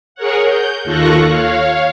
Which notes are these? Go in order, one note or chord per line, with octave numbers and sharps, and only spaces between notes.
G#4 A#4 C#5 F#5
G6
D#2 F4 A4 C#6 F#6 A#6
C#5 F5